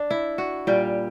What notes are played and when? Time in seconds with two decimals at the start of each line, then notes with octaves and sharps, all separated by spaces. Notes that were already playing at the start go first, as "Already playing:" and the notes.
Already playing: D4
0.11 E4
0.38 F#4
0.67 A#2 G3 G4